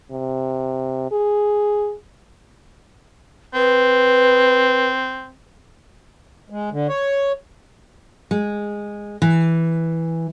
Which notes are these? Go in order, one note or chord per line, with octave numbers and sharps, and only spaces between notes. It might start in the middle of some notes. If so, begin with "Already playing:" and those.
C3
G#4
C4 B4
G#3
D3
C#5
G#3
E3